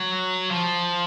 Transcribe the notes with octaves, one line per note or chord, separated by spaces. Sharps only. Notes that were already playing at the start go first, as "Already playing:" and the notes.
Already playing: F#3
F3